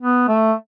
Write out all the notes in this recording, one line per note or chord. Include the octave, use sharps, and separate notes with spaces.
B3
A3